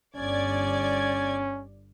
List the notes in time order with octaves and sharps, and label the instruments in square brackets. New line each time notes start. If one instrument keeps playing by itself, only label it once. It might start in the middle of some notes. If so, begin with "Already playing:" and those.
[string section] G1 D5 G#6 [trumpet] C#4